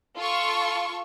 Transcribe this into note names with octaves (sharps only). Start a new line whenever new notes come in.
F4 A4 C#6